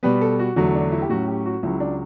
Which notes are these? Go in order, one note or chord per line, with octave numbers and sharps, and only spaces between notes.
B2 G3 B3 B4
A4
F#4
E2 D3 F#3 A3 F#4
D4
E4
G4
A2 F#3 C#4 F#4
G4
F#4
C#2 C#3 F#3 E4
D4